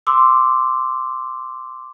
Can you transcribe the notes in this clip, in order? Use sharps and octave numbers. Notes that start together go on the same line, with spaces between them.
C6 D6 E6